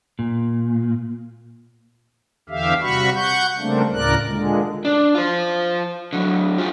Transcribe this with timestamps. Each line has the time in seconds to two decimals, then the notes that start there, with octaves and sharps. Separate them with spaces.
0.19 A#2
2.49 E2 D3 G4 E5 F5
2.81 C3 G3 F#4 B5 C#6
3.15 F#5 C#6 G6
3.59 C#3 G3 A3 A#3 C4 D4
3.93 D2 A2 C#3 A#4 D5 F#6
4.26 A#2 D3 G#3
4.85 D4
5.15 F4 C5
6.13 D3 F#3
6.58 F4 G4